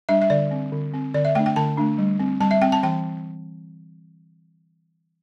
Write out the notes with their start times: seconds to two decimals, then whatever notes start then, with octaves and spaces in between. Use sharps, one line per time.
0.09 G3 D4 E5
0.22 E5
0.30 D3 D5
0.51 C4
0.72 D3
0.94 C4
1.14 D3 D5
1.25 E5
1.35 A3 G5
1.39 D4
1.46 G5
1.56 D3 A5
1.78 A3 D4
1.98 G3
2.20 C4
2.41 G3 A5
2.51 E5
2.62 C4 G5
2.72 A5
2.83 E3 G5